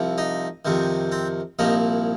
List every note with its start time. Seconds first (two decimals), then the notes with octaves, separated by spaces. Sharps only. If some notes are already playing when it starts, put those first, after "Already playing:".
Already playing: C2 C3 F3
0.18 D#4
0.65 F2 C3 D#3
1.12 C4
1.59 C2 A#2 F3 D#4